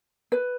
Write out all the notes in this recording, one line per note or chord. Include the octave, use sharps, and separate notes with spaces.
B4